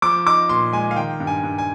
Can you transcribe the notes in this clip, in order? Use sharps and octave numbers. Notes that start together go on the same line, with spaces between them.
F3 D6
D#4 D6
A#2 C6
G#3 G#5
F5
D#3 G5
G2
G#5
G2
G#5